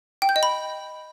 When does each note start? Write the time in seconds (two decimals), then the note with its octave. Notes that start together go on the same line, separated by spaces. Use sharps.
0.22 G5
0.29 G6
0.36 D#5
0.43 B5